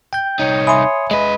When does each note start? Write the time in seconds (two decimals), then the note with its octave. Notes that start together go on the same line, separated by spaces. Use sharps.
0.13 G5 G6
0.39 C2 D#4 C#5
0.67 E5 G#5 B5 C6 D#6
1.11 G#3 B4 D#5